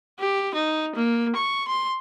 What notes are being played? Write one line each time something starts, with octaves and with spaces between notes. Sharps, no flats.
G4
D#4
A#3
C#6
C6